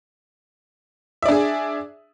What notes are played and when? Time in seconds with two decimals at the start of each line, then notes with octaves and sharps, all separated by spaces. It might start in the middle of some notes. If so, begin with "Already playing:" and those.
1.22 E5
1.26 D5
1.29 D4
1.32 G#4